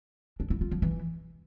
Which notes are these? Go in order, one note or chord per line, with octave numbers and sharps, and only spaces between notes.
D4
E4
F4
F3
E3